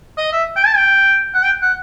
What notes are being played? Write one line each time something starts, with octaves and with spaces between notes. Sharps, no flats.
D#5
E5
G5
A5
G5
F#5
G5
F#5